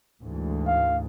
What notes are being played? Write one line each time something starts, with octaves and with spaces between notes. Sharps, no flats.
D2 G#2 E3
F5